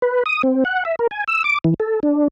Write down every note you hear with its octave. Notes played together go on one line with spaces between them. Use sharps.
B4
D#6
C4
F#5
E5
A#4
G#5
E6
D6
E3
A4
D4